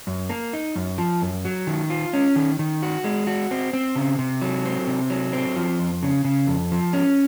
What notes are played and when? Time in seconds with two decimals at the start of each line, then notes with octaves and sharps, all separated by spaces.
0.07 F#2
0.30 A#3
0.53 D#4
0.76 F#2
0.98 F3
1.22 F#2
1.45 F#3
1.67 D#3
1.90 F4
2.13 C#4
2.36 D#3
2.59 D#3
2.82 F#4
3.04 G#3
3.27 F#4
3.51 C4
3.73 C4
3.96 C#3
4.19 C3
4.42 F#3
4.65 C4
4.87 C3
5.10 F#3
5.33 C4
5.56 F3
5.79 F2
6.03 C#3
6.25 C#3
6.47 F2
6.71 F3
6.93 C#4